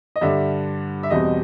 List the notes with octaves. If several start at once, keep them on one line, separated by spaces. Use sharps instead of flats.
D#5
G2 D3 G3 E5
E5
E2 B2 G3 C4 D#5